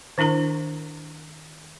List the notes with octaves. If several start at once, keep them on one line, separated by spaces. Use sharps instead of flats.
D#3 D4 E4 A#4 A#5